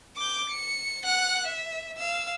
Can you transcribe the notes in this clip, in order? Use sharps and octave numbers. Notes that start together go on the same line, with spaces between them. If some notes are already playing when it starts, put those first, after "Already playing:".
D6 G6
C#7
F#5 F#6
E5
F5 E6